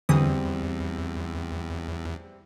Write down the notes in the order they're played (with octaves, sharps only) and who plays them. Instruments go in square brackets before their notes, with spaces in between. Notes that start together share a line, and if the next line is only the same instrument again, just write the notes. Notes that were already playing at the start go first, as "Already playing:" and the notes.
[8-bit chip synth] E2 [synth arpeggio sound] D3 E3 D#6 [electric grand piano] G3 C4